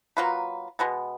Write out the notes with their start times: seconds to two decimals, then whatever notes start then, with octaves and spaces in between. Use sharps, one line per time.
0.17 F#3 A#3 F4 B4
0.79 B2 G#3 B3